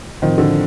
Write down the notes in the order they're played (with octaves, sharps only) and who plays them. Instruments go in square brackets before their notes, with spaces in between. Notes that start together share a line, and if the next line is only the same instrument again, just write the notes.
[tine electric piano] A2 F3 C4 F4 C5 [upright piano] D#3
[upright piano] D3